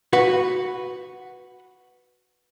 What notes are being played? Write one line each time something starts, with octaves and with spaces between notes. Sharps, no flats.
F#4 B4 F#5